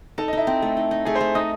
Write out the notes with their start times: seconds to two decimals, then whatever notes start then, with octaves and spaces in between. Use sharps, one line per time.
0.18 D#4 A4 A5
0.28 D#5
0.33 D#4 E4 E5
0.47 C4
0.62 A3
0.77 D#4
0.91 D#4
1.05 A3 G#4 G#5
1.15 C5 C6
1.20 A3
1.35 D#4 D#5 D#6